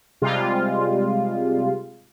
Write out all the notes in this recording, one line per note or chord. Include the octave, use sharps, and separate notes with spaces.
C3 G3 G#3 F4